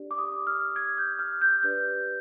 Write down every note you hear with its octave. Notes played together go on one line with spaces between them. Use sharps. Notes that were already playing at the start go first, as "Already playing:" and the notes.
Already playing: D4 G4 D5
D6
D#6
F6
G#6
G6
F6
G6
D4 G4 B4 D5 G6